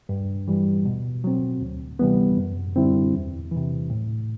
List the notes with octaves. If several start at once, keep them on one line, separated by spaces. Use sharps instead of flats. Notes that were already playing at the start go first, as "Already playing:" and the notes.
G2
E3 G3
B2
F#3 C4
D2
C3 E3 G3 B3
F#2
D3 G3 C4 E4
E2
C3 E3
A2